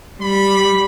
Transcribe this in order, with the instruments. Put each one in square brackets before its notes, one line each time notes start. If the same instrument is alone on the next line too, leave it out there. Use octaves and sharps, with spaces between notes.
[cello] G3 [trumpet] B5